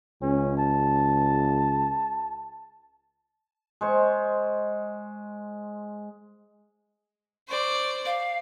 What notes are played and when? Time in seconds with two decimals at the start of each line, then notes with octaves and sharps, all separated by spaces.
0.22 C#2 C#4
0.58 A5
3.81 G#3 C5 C#6
7.48 C5 D5 C#6
8.06 F5